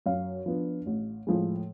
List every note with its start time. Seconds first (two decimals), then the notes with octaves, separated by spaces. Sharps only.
0.06 F#2 F5
0.46 F3 B3 D4
0.86 A1
1.27 A2 F3 G#3